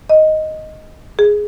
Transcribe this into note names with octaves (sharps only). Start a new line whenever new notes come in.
D#5
G#4